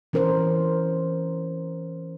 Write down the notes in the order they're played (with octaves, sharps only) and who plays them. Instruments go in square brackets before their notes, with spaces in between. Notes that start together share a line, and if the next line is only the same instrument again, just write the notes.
[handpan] E3 C#4 A#4 C5